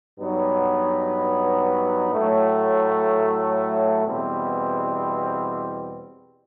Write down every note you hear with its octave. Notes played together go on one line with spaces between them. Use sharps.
G2 F#3 B3 D#4
A2 F#3 A3
E2 B2 G3 C4